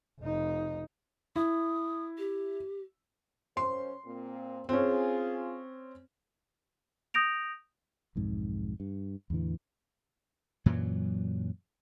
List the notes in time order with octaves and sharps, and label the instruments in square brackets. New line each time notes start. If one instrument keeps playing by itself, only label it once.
[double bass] F1 D#4
[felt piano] E4 [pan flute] D#6
[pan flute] G4
[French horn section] F#2 C#4 C5 [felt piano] C6
[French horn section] A#2 C4
[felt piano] C4 C#4 [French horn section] F4 G#4
[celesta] D#6 G6 A#6 D7 F7
[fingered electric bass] B1 F2 G#2
G2
E2 A2 D3 E3
[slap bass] F#2 A#2 E3 F#3